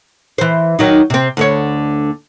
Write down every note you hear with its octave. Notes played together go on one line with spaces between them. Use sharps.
E3 C5
D#3 F#3 D#4
C3 C4
D2 D3 C#5